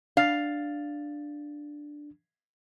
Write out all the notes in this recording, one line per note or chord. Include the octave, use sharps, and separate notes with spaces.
D4 F5 A6